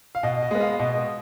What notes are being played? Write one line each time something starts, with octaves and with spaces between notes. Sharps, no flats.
F5
B2 D#5
D#5
G#3 B3
F5
B2 D#5